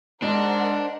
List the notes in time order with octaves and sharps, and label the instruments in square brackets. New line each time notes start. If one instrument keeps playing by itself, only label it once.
[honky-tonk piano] G#2 G#3 [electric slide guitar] D4 [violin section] A#4 C5 F#5 [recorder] D#5